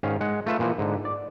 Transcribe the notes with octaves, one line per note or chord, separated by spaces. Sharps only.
G#2 D#3 C#4 F5
G#3 F#5
A3 F4 B4 E5
A#2 E3 F3
G#2 D3
D5